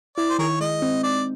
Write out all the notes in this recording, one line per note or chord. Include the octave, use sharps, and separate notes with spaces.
E4 D5
C5
D#3 G#4 A#4 C#5
G#3 D#5
C4
D#4 D5